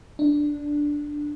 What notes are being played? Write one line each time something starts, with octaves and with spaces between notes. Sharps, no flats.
D4